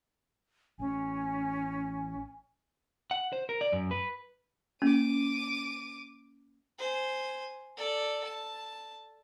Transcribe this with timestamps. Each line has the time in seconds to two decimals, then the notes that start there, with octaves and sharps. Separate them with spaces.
0.79 A1 C#4 G#5
3.11 F#5
3.33 C5
3.49 A#4
3.61 D5
3.72 F#2
3.91 B4
4.82 A#3 C#4 D6 D#7
6.79 C5 G#5
7.77 A4 D5
8.24 A5